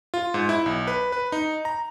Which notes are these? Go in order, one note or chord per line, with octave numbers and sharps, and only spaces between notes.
F4
G#2
E4
B1
B4
B4
D#4
A#5